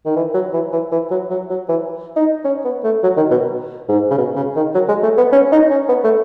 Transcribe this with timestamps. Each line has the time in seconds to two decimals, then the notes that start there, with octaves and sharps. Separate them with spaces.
0.06 D#3
0.16 E3
0.34 F#3
0.53 E3
0.72 E3
0.92 E3
1.11 F#3
1.30 F#3
1.50 F#3
1.69 E3
2.16 D#4
2.45 C#4
2.65 B3
2.84 A3
3.03 F#3
3.17 D#3
3.31 B2
3.89 G#2
4.10 C#3
4.18 B2
4.36 C#3
4.56 D#3
4.74 F#3
4.88 G#3
5.03 A3
5.17 B3
5.32 C#4
5.52 D#4
5.70 C#4
5.89 B3
6.04 A3